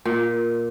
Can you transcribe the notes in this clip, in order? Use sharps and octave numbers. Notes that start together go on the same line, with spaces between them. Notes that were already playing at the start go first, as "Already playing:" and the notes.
A#2